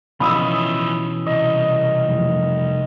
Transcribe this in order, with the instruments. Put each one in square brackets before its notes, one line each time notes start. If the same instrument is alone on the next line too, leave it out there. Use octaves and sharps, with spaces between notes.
[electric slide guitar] B2 E3 C#4 [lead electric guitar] F3 D#4 [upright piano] B5 D#6 E6
[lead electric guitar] C2 [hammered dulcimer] D#5
[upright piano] F1